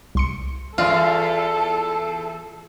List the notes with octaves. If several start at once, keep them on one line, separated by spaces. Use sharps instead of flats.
C2 C6 C#7
E2 F4 A4 D5